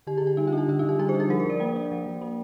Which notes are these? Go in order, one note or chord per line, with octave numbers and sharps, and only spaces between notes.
D3 G4
D3 G#4
G4
G3 D#4
F4
D4
G4
D3 F4
D3 D#4
G4
G3 G#4
C5
D4
G#4
F3 A#4
C5
F3 D5
A#3 G5
D4
F3
F3
A#3